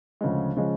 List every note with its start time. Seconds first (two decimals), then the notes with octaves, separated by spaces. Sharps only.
0.21 D2 C#3 F3 G#3
0.57 C#3 F3 G#3